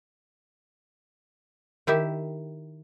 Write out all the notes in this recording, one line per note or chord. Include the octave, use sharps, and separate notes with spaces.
D#3 E4 G4 E5